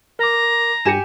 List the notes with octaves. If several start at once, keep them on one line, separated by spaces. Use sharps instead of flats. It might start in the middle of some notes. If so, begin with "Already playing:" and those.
A#4 A#5 D6
G2 G4 G#5 C#7 E7